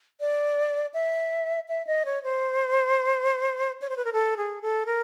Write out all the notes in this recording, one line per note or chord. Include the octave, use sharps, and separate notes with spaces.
D5
E5
E5
D#5
C#5
C5
C#5
C5
B4
A#4
A4
G#4
A4
A#4